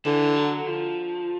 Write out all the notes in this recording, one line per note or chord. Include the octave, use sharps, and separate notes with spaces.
D3 E3
F#3
F3